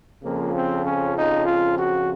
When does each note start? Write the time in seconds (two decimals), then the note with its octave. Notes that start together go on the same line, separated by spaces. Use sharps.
0.24 F2 C#3 F3 A#3
0.55 C4
0.85 C#4
1.16 D#4
1.45 F4
1.77 F#4